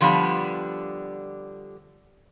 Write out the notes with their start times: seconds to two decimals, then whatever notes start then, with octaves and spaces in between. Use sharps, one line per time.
0.01 D3 F3 G3 B3 D4